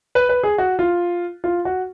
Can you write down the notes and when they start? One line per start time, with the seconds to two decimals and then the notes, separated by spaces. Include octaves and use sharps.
0.15 B4
0.29 B4
0.43 G#4
0.58 F#4
0.79 F4
1.44 F4
1.65 F#4